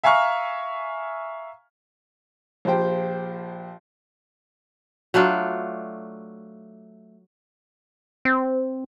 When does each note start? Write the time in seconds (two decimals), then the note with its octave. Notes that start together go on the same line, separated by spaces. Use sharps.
0.04 E5 F5 G#5 A#5 C#6 F6
2.65 A#1 F3 G4 C5 G5
5.14 F#3 A3 D4 F4
8.25 C4